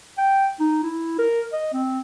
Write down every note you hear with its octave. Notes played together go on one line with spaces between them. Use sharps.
G5
D#4
E4
A#4
D#5
C4